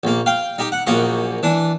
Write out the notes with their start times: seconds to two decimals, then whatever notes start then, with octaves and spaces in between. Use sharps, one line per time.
0.03 A#1 A#3
0.26 F5 G5
0.58 D#4 G4
0.72 F#5
0.87 A#1 F#2 A#3 D#5 C#6
1.43 E3 D4